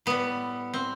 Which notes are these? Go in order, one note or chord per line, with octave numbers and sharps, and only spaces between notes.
A2 G3 B3
C4